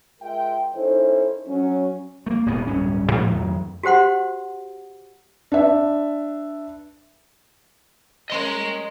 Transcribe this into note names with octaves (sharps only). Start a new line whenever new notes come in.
G#3 F4 A#4 E5 G5
D#3 C#4 D#4 E4 A4 C5
F#3 C#4
A3 A#3
D#1 G#2 B2 B3
D1 G2 C#4
A2 F3 G#3 A3
F2 D#3 F#3
F#4 G4 C5 F#5 C6
D4 B4 E5
C#4 A#4 D#5 C6